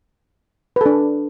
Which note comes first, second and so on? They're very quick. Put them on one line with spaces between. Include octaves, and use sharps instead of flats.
B4 A4 D4